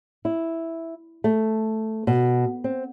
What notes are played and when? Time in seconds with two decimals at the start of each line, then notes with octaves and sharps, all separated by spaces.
0.25 E4
1.24 A3
2.07 B2
2.64 C4